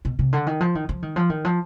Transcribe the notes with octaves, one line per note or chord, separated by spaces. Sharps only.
B2
C3
D3
D#3
F3
D#3
F3
D#3
F3
D#3
F3